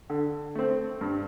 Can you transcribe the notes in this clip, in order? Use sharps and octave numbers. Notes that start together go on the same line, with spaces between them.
D3
A3 C4
G2